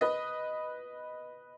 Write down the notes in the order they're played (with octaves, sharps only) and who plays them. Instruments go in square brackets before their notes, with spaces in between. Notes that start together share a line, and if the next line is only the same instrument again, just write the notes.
[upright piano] B4 D#5